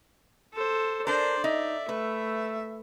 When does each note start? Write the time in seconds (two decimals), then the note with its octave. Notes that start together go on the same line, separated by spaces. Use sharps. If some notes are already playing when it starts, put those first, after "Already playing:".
0.53 A4 C5
1.07 D4 A#4 C5 D5
1.44 D#4 E5
1.89 A3 B4